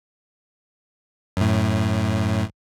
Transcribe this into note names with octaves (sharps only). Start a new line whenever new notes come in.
F#2 A2